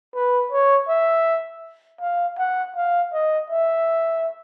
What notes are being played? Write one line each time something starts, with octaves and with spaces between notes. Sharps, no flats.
B4
C#5
E5
F5
F#5
F5
D#5
E5